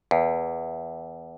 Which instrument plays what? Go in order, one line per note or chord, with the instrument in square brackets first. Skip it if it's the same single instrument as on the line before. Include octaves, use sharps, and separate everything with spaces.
[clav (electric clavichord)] E2